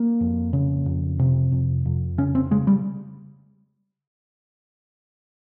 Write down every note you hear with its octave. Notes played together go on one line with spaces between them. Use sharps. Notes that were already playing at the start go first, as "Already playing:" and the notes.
Already playing: A#3
F2
C#3
F2
C3
F2
F2
C#3 C#4
C4
C#3 G#3
G3